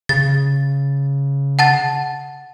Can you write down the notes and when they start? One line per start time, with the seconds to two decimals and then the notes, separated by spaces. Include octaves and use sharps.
0.09 C#3 A6
1.59 F#5 A5 A6